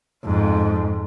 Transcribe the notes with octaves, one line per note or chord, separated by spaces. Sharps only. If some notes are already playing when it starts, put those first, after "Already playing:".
F2 G#2